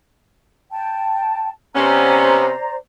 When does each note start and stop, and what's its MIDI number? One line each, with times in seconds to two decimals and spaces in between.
0.72 1.49 79
0.72 1.49 81
1.75 2.52 48
1.75 2.52 59
1.75 2.52 61
1.75 2.76 72
1.75 2.76 74
1.75 2.76 82